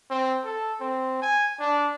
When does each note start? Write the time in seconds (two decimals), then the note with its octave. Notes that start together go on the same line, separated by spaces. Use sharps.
0.10 C4
0.45 A4
0.80 C4
1.22 G#5
1.59 D4